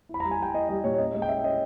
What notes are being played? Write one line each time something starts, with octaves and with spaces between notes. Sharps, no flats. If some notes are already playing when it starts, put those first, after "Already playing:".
E4 B5
A#5
G3
G#5
G3 G5
E4 D#5
G3 D#5
A#2 C#5
C#5
C#4 D#5
G#3 D#5
G5
C#4 E5
C#4 D#5